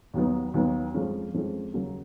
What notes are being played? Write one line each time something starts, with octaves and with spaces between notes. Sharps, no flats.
D#2 D#3 F#3 B3
D#2 D#3 F#3 B3
F2 F3 G#3 C#4
F2 F3 G#3 C#4
D#2 C#3 F#3 A#3 C#4